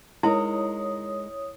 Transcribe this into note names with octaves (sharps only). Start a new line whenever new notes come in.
G#3 D#4 E4 A#4 C#5 D#6